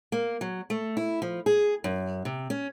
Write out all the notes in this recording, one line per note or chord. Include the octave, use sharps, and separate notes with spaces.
A#3
F#3
A3
E4
F3
G#4
F#2
C3
C#4